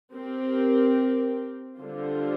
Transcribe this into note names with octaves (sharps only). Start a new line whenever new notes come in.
C4 G4 A#4
D3 G3 D4 F4 C5